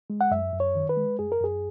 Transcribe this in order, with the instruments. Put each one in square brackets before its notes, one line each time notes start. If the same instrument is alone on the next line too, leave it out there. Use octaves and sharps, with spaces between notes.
[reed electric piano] G#3
F#5
F#2 E5
F#2
C#5
D#3
B4
G#3
F#2 G#4
A#4
F#2 G#4